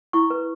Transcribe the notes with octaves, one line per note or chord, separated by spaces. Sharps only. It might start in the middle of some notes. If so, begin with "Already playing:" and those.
E4 C#6
B4